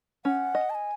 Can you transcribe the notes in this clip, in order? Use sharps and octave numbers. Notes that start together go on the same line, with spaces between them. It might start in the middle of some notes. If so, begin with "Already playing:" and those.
C#4 F#5
D#5
A5
G#5